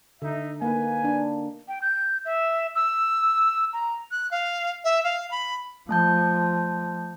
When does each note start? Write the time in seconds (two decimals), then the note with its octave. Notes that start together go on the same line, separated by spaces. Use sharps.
0.22 D3 D#4 E5
0.62 A#3 D#4 B4 G#5
1.04 D4
1.68 G5
1.82 G6
2.25 E5
2.75 E6
3.73 A#5
4.11 F#6
4.31 F5
4.84 E5
5.04 F5
5.31 B5
5.89 F3 A3 A5 G6